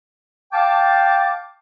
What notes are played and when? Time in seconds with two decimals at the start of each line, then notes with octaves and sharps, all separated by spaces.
0.53 F5 G5 A5 D6